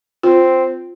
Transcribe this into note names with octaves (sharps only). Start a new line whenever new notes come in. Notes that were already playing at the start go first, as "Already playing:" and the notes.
C4 F4